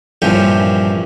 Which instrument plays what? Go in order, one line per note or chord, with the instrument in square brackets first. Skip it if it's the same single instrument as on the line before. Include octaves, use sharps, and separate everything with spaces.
[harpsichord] A#1 G2 E3 F3 C#4 G5